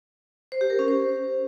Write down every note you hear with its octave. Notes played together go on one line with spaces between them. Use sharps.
C5
G4
A#4
C#4
C5